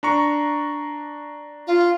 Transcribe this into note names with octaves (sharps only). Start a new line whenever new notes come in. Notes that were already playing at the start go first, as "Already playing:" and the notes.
D4 A#5 C#6
F4